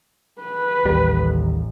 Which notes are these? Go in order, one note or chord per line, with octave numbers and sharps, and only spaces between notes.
B4
A1 D#2 G3